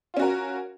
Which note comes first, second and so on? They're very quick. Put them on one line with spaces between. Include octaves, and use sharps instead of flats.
F4 C#4 F#4 A#4